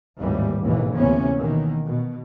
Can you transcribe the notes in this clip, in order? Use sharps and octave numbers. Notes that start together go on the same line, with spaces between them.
G#1 D#2 A2 E3 G3
A1 D#2 G#2 B2 E3
D2 C3 E3 A#3 B3 C#4
B2 D#3 E3 A#3
B2